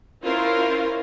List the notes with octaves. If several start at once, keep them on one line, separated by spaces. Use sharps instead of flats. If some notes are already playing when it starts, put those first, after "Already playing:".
C#4 E4 F4 A#4 C5